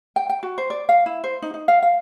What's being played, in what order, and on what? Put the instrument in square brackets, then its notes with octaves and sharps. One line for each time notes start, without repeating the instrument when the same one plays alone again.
[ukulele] G5
G5
F#4
C5
D5
F5
E4
C5
D#4
D#4
F5
F5